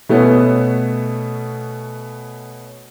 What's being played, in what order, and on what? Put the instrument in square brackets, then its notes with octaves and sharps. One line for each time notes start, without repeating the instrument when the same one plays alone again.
[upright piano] B2 A3 B3 C#4